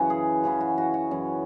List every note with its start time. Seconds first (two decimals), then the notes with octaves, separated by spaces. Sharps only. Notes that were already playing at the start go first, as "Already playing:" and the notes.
Already playing: F#2 C#3 E3 C#4 F#4
0.10 G#4
0.44 F#2 C#3 E3 C#4 G#4
0.61 F#4
0.78 F#4
0.94 F#4
1.11 F#2 E3 C#4